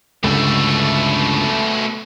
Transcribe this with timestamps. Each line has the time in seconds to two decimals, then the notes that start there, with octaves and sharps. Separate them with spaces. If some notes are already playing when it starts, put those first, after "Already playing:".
0.23 C#2 G2 B2 D3 A3